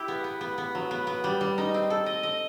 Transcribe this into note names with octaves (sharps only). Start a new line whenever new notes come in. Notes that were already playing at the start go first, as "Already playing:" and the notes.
Already playing: E4 G4
B3
B3
B3
B3
F#3
B3
B3
G3
G3
D#4
C4
A4
D#5
D#5